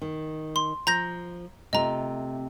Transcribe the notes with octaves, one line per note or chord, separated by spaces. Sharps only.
D#3
C6
F3 A#5 G6 A#6
C3 A3 F4 D#5 A#5